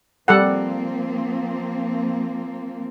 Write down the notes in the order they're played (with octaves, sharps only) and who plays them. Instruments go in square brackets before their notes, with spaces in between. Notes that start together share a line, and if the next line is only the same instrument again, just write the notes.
[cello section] F3 A#3 C4 [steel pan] G3 A4 F#5